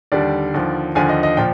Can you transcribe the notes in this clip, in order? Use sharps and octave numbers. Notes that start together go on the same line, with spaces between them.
D#2 D3 G3 D5
D#2 D3 F3
D#2 D3 F3 G#5
D#5
D#5
A#2 F3 G5